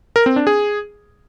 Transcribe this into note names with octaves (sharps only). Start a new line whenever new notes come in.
A#4
C4
D4
G#4